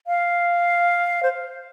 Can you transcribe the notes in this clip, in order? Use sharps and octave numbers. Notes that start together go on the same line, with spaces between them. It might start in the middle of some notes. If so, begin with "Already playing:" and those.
F5
C5